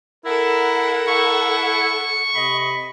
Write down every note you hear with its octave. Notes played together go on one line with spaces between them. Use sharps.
E4 A4 A#4 F#5
E4 C#6
C3 D#5 B5